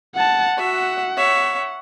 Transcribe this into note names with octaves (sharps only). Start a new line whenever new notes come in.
F#5 A5
F#4 E5 F#5
C#5 E5